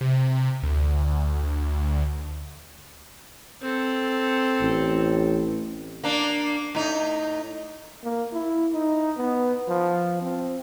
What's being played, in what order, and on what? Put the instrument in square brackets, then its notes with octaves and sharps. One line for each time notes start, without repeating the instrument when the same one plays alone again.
[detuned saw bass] C3
D2
D2
[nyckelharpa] C4 A4
[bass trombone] A1
[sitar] A#3 D4
A2 D#4
[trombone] A#3
E4
D#4
B3
F3
C4